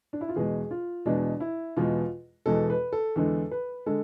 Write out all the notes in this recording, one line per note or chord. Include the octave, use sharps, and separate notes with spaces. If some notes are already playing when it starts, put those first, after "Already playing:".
D4
E4
F4
E2 B2 G#3 G#4
F4
E2 B2 G#3 D4
E4
E2 B2 G#3 F4
E2 B2 G#3 A4
B4
A4
E2 D3 G#3 A4
B4
D3 G#3 A4